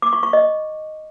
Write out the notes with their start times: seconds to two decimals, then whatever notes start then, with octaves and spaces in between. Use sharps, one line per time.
0.02 D6
0.13 C#6
0.23 C#6
0.33 D#5